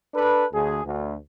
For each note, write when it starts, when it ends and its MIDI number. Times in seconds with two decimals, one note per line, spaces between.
0.14 0.46 62
0.14 0.46 69
0.14 0.46 71
0.53 0.85 38
0.53 0.85 68
0.85 1.15 38